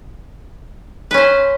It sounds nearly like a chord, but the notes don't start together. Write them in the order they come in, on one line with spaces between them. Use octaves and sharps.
B4 C#4 C5